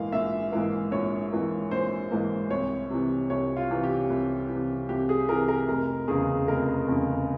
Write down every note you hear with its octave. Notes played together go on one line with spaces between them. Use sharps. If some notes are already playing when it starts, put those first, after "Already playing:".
Already playing: A#1 G#2 E3 A#3 F5
A#1 E5
G#2 E3 A#3
A#1 C#5
G#2 E3 A#3
A#1 C5
G#2 E3 A#3
C2 C#5
C3 E3
C2 C#5
F4
C3 E3
G4
C2
C3 E3
C2 G4
G#4
C3 E3 A#4
A#4
F1 A#4
E2 C#3 G#4
F1 A#4
E2 C#3